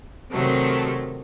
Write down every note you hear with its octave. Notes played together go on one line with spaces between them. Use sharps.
C3 D#3 F#3 A3